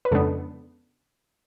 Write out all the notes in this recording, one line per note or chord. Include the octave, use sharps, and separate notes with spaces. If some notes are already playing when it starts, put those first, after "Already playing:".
B4
F2 C#3 G#3 B3 D4 A4